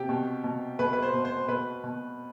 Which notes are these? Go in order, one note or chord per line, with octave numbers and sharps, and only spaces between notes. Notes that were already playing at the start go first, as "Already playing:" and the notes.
Already playing: C3 G4
B2
B2
B2 B4
B4
C5
B2
C5
B2 B4
B2